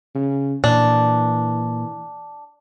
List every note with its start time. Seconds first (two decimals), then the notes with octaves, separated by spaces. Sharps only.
0.15 C#3
0.64 A#2 E3 D4